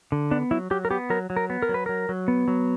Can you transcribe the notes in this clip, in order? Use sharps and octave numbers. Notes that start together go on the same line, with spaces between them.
D3
B3 D4
F#3 E4
F#3 G4
A#4
B3 G4
F#3 A#4
F#3
A#4
B3
A#4
F#3
B4
F#3 A#4
F#3
B3
F#3